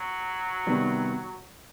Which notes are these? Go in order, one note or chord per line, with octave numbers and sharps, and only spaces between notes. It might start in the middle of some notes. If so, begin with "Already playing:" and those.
Already playing: F#3
C3 D#3 G3 B3